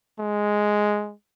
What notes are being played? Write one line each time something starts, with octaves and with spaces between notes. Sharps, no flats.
G#3